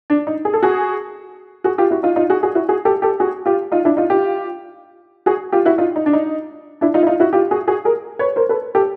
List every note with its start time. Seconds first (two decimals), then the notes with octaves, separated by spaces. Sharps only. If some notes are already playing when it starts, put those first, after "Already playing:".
0.10 D4
0.27 D#4
0.45 G#4
0.53 A4
0.63 F#4 G#4
1.64 F#4 G#4
1.78 F4 G4
1.91 E4 F#4
2.03 D#4 F4
2.16 D#4 F4
2.30 F#4 G#4
2.43 F#4 G#4
2.55 E4 F#4
2.69 F#4 G#4
2.85 G4 A4
3.02 G4 A4
3.20 F#4 G#4
3.46 F4 G4
3.72 D#4 F4
3.85 D4 E4
3.97 D#4 F4
4.10 F4 G4
5.26 F#4 G#4
5.52 F4 G4
5.65 E4 F#4
5.78 D#4 F4
5.96 D#4
6.06 D4
6.13 D#4
6.81 D4 E4
6.94 D#4 F4
7.03 E4
7.07 D#4 F4
7.20 E4 F#4
7.33 F4 G4
7.51 F#4 G#4
7.67 F#4 G#4
7.85 G#4 A#4
8.19 B4 C#5
8.36 A#4 C5
8.49 A4 B4
8.75 G4 A4